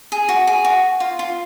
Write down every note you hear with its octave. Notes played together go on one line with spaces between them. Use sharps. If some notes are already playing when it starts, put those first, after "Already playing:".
G#4
F#4
G#4
F#4
F4
F4